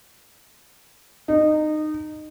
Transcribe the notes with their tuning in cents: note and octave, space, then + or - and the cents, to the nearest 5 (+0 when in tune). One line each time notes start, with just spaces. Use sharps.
D#4 -20